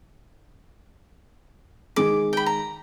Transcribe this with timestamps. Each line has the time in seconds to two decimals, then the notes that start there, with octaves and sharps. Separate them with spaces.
1.96 D#3 G#3 G#4 D6
2.33 G5 B5
2.46 A#5